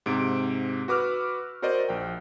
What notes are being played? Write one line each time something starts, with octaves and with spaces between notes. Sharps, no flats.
G#2 C3 D7
F#4 B4 D6 E6 F6
F#4 A#4 C5 D5 D#5
A#1 G5